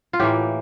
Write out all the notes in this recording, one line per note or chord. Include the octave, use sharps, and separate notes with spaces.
F4
A2 E3 A#3 G4